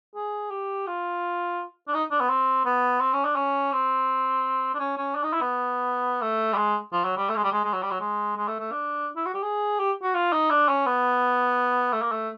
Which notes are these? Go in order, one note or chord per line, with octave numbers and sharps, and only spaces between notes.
G#4
G4
F4
D4
D#4
D4
B3
C4
B3
C4
C#4
D4
C#4
C4
D4
C#4
C#4
D4
D#4
E4
B3
A3
G3
G#3
F3
F#3
G3
A3
G#3
G3
G#3
G#3
F#3
G3
F#3
G#3
G#3
A3
A3
D4
E4
F#4
G4
G#4
G4
F#4
F4
D#4
D4
C#4
B3
A3
A#3
A3